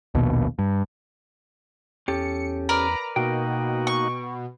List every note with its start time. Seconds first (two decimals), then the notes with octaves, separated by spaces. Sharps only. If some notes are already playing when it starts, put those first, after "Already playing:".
0.15 A#1 D#2 B2
0.59 G2
2.08 E2 C#4 G4 A4 C#7
2.69 A#4 B4 D5 A#5
3.16 B2 A#3 D#4 F#4 G5
3.87 C#6